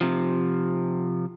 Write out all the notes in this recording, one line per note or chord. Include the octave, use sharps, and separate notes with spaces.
C3 F3